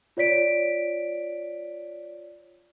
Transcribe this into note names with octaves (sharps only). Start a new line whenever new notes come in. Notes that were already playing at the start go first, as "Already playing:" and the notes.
F4 C#5 D5 B6 D7